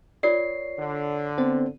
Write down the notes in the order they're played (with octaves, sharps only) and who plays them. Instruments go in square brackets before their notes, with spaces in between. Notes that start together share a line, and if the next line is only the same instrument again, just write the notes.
[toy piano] F4 A#4 D5 [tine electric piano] C#5 C7
[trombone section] D3
[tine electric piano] B3 C4 C5